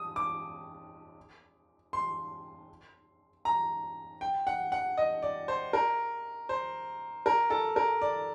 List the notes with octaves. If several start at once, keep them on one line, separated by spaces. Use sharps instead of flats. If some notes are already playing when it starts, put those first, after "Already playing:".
Already playing: D#6
D6
C6
A#5
G5
F#5
F#5
D#5
D5
C5
A#4
C5
A#4
A4
A#4
D5